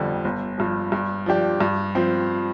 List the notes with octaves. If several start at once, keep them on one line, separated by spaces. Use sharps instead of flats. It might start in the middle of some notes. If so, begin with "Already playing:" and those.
Already playing: G1 F2 D3 G3
G1
G2 F3
G2
F3 D4 G4
G2
F3 C4